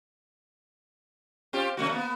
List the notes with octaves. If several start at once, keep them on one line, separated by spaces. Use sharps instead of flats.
C4 F4 G4
C3 A3 F#4
A#3 B3